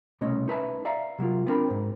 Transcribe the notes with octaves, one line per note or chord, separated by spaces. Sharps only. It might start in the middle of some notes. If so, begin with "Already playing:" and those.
C2 B2 A3 C#4 C#5 D#5
D#4 B4 E5 A5
D5 E5 F5 A#5
C3 F#3 A#3 F4
B3 C4 D4 A#4 G5 B5
G#2 C5